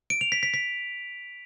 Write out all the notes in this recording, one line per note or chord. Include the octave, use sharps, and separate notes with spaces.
D7
F7
B6
B6
B6